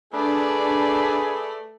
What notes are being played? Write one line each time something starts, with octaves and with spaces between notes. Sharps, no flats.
A3 D4 G#4 B4 D5